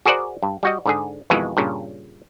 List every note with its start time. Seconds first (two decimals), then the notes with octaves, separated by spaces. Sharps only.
0.06 F#4 G#4 A#4 C5 D5 F#5
0.43 G2
0.63 G3 F#4 D#5
0.86 G#2 D3 G#4
1.30 F2 B2 D#3 E3 G#3
1.57 G2 A#2 C#3